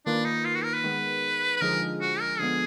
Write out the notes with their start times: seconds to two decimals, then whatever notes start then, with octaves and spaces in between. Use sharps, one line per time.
0.06 D#3 A#3 D4 F4 B4
0.25 D#4
0.45 F4
0.55 F#4
0.64 A#4
0.74 B4
0.84 D#3 G#3 B3
1.57 B4
1.61 D3 F3 G#3 D#4 G#4 A#4
2.01 F#4
2.20 A#4
2.39 D3 F3 G#3 B3 G#4